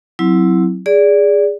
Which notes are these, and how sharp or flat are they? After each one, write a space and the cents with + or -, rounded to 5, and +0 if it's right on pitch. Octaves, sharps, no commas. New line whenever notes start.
F#3 +0 C4 +0 E4 +0
G#4 -15 D5 -15